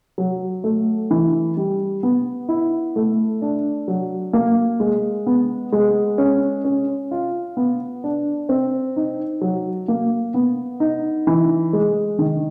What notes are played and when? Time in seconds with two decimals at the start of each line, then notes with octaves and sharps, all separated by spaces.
0.18 F#3
0.64 A3
1.11 E3
1.57 G3
2.03 B3
2.49 E4
2.96 A3
3.42 D4
3.88 F#3
4.33 A#3
4.80 G#3
5.26 B3
5.72 G#3
6.18 C#4
6.64 C#4
7.11 F4
7.57 B3
8.04 D4
8.49 C4
8.96 D#4
9.41 F#3
9.88 A#3
10.34 B3
10.80 D#4
11.27 E3
11.73 G#3
12.19 D#3